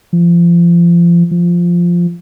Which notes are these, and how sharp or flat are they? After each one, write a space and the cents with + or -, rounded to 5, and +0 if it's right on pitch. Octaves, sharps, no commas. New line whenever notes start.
F3 -30
F3 -5